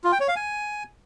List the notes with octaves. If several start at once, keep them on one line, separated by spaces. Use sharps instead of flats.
F4
G5
C#5
F5
G#5